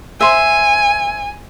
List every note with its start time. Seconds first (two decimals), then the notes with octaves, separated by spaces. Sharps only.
0.21 C5 E5 G#5